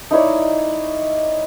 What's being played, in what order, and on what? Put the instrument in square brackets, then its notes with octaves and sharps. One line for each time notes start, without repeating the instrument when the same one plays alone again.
[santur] D#4 E4 C#5 D5